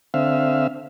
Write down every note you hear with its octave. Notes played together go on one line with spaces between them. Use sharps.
D3 C4 E5 F5